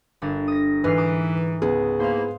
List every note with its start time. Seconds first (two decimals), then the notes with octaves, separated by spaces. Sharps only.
0.22 G1 D4 A#4
0.48 D#6 A#6
0.84 G#2 E3 B4 F6 C7
0.98 A#5 D6 D#6
1.62 C#2 B3 G#4
2.00 G#2 A#3 E4 C5 F5